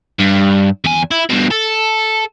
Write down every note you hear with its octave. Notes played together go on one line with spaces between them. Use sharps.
G2
E2 G#5
E4
G2 B2
A4